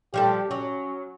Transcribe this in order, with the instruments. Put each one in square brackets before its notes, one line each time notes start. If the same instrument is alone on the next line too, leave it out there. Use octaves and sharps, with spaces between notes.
[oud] F3 G3 A4 [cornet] G4
[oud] F#3 [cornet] C#4